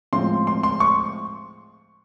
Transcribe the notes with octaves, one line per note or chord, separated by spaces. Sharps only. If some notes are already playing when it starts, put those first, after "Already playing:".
A2 F3 G#3 C4 C6
C6
C6
C#6